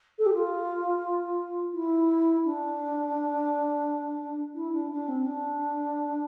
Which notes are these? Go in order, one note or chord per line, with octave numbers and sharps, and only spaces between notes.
A4
G4
F4
E4
D4
E4
D4
D4
C4
D4